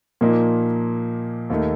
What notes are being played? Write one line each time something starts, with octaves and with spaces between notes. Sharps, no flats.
A#2 F3 A#3 D#4
D#2 D#3 A3